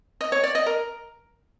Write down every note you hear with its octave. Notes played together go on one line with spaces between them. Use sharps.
D#5
C#5
D5
D#5
A#4